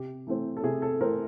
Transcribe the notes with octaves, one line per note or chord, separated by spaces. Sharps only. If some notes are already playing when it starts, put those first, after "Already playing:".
Already playing: C3 G4
E3 A3 C4
A4
C3 G#4
A4
E3 A3 C4 A#4